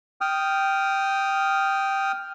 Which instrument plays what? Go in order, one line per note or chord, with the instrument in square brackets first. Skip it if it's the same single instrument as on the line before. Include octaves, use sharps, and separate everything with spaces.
[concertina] G5 D#6 F6